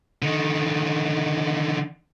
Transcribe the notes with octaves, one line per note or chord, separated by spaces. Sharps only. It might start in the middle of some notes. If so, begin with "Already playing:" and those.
D3 D#3